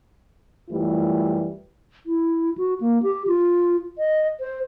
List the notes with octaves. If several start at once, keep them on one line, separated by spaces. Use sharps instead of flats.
F#2 E3 G3 A3 E4 F4
E4
F#4
A#3
G4
F4
D#5
C5